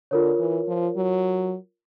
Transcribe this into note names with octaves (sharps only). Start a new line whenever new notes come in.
D3 F4 A#4 C#5
E3
F3
F#3